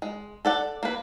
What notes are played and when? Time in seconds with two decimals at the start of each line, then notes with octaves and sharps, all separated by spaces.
0.02 G#3
0.45 A4 D5 F#5
0.83 A#3 B4